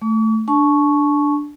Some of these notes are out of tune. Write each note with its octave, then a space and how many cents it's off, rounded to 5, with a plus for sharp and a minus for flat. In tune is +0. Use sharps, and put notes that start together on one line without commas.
A3 +0 C#6 +45
D4 +0 A5 -35 C#6 +0